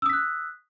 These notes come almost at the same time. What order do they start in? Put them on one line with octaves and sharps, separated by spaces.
E6 D#6 B6 F#6